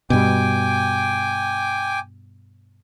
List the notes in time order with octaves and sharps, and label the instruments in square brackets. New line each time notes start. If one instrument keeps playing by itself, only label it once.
[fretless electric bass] G2 B2 [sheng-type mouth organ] G5 G#5 D6